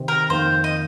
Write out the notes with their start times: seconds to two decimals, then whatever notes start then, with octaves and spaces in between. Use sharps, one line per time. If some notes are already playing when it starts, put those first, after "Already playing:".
Already playing: C3 D#3 C4
0.08 A#4
0.30 F2 D#3 A#3 C5
0.64 D#5